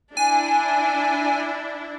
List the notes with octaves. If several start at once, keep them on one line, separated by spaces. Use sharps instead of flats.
D4 E4 G#5